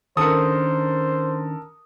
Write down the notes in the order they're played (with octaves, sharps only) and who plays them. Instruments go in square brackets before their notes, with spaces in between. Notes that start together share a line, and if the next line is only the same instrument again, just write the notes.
[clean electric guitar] D#3 C#4 D4 [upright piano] A4 A#4 [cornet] C5 [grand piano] D#6 C#7